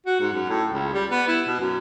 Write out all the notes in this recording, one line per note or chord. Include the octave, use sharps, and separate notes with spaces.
F#4
G#2
F#2
A2
C#2
G3
B3
E4
B2
F#2